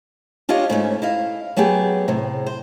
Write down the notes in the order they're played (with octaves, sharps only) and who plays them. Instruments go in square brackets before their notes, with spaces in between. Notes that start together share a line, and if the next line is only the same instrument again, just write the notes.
[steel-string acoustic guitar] D4 F4 G4 C#5 D#5
G#2 A3 C#4
E4 D#5 F5
F#3 A3 B3 G4 G#4
A2 C3
C5